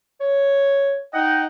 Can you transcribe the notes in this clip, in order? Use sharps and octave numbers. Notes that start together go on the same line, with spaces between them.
C#5
D#4 D#5 F#5 G5